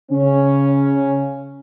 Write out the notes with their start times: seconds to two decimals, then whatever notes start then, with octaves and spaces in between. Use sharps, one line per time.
0.12 C#3 C#4